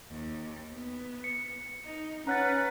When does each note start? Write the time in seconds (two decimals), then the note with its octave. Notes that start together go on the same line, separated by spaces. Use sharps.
0.11 D#2
0.72 B3
1.24 C#7
1.84 D#4
2.27 C#4 B4 F#5 A#5 F#6 A6